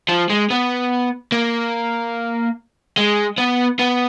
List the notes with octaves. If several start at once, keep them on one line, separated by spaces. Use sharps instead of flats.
F3
G#3
B3
A#3
G#3
B3
B3